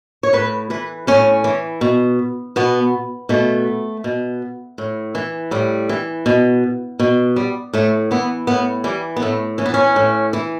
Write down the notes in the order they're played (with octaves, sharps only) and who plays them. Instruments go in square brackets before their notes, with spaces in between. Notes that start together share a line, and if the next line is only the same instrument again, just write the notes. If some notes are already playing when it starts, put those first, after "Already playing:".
[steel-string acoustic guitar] C#5
A2 B4
E3 B4
A2 C#4
E3
B2
B2 B3
B2 A3
B2
A2
E3
A2 G3
E3
B2
B2
G3
A2 A3
E3 B3
A2 B3
E3 G3
B3
A2 A3
E3 C#4
B3
C#4
A2
E3